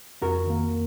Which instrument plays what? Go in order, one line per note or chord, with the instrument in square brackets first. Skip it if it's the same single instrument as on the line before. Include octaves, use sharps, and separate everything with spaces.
[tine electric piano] F2 [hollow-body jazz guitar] F#4 A#4
[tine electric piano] D#3 A#3